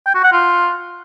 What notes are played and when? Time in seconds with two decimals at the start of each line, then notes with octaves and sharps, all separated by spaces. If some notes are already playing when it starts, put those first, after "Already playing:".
0.06 G5
0.15 F#4
0.24 F#5
0.33 F4